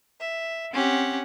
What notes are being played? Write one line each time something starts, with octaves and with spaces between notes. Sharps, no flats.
E5
C4 C#4 G4 F#5